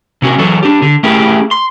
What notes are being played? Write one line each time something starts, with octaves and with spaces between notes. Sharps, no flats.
C3 C#4 F#4 A#4
E3 F#3 A4 C#5
D4 G4
D3
A3 C#4 E4 G4 G#4 A#4
C6